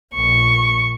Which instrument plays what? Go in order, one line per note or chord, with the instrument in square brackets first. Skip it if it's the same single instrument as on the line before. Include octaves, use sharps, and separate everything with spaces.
[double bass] A#1 [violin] C#6